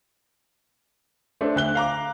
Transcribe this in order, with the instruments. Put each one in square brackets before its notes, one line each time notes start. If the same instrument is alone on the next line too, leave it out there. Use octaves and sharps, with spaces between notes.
[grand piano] A3 D4 A4 C5
D2 F#6 G7
F5 A#5 D6